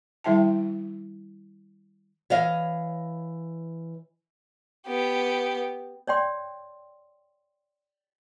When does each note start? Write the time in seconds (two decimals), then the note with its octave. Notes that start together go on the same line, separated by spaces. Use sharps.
0.24 D#3 G3 E4 E5 G5 A5
2.30 E3 C#5 D#5 F5
4.87 B3 G4
6.07 C#5 D5 G5 C6